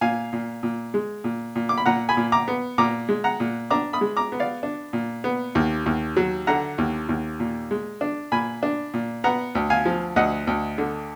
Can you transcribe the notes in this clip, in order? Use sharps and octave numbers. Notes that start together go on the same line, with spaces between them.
A#2 F5 G#5
A#2
A#2
G#3
A#2
A#2
D6
B5
A#2 F#5 A#5
G#5 B5
A#2
A#5 D6
B3
A#2 A#5 D6
G#3
F#5 A#5
A#2
D4 A#5 D6
B5 D#6
G#3
A#5 D6
B3
D5 F5
D4
A#2
B3
D#2
D#2
F#3
D3 F#5 A#5
D#2
D#2
A#2
G#3
D4
A#2 G#5 B5
D4
A#2
B3 F#5 A#5
D2
F5 G#5
F3
D2 D#5 F#5
D2
D3